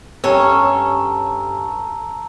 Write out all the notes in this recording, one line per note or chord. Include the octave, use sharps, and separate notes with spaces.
G2 C#4 A4 C#5 A5 A#5 E6